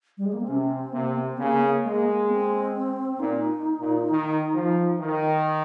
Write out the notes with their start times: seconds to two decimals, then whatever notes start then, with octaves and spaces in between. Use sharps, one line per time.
0.18 G3
0.26 G#3
0.33 A#3
0.41 C4
0.48 C3 C#4
0.71 C4
0.93 C3 A#3
1.17 C4
1.38 C#3 A#3
1.62 A#3
1.83 G#3 A#3
2.06 A#3
2.29 C4
3.19 A#2 D#4
3.80 A#2
4.10 D#3
4.55 F3
5.01 D#3